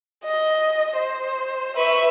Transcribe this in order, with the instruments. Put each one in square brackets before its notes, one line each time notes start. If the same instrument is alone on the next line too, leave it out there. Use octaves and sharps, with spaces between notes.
[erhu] D#5
C5
[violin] B4 C#6 [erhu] E5